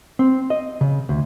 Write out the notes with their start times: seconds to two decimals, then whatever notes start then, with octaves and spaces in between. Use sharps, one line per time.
0.19 C4
0.50 D#5
0.81 C#3
1.09 D2